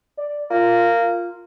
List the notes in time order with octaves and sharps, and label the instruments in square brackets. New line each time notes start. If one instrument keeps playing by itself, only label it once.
[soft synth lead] D5
[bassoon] A#3 [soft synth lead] F4